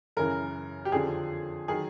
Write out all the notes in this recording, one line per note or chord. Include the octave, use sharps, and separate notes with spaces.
F#2 C#3 E3 A#4
G4
F2 D3 F3 G#4
D#3 F#3 G#4